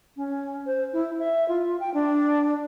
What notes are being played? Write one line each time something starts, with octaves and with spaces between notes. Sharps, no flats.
C#4
C5
E4
E5
F4
G5
D4